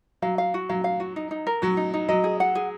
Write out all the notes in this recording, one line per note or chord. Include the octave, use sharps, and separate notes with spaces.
F#3 F5
F5
F#4
F#3 F5
F5
F#4
D#4
D#4
A#4
F#3 F#4
D#4
D#4
F#3 D#5
G#4
F#5
G#4